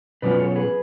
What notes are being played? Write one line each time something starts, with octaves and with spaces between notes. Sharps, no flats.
B2 F#3 C#4 F4 B4 D5
A4 C#5
C#5
G#4 B4